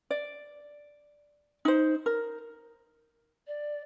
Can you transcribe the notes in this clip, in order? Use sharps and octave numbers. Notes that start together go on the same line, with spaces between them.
D5
D#4 C5
A#4
D5